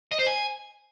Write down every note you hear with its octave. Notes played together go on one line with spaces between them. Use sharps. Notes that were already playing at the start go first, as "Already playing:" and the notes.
D#5
C5
G#5